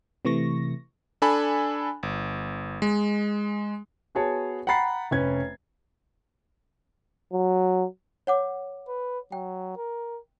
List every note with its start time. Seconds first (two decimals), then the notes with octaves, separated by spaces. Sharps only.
0.25 C3 E3 A3 C#6 A#6
1.22 D4 A4 G#5 B5
2.03 G1
2.82 G#3
4.15 B3 F#4 G#4 C#5 A5
4.67 F#5 G5 A#5 B5 A6 C7
5.11 F1 C#4 B4 G#6
7.33 F#3
8.27 C#5 F#5 D6
8.88 B4
9.32 F#3 G5
9.77 A#4